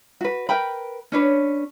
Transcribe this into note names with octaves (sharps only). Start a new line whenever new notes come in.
F#4 B4
A#4 B4 G5 B5
C#4 D4 B4 C#5